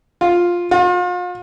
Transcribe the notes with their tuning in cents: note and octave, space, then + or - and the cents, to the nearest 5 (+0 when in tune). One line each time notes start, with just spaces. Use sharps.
F4 +5
F4 +40